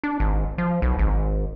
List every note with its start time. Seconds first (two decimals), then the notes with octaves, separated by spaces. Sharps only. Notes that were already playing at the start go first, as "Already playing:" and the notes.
0.03 D4
0.20 G#1
0.58 F3
0.82 B1
0.99 G#1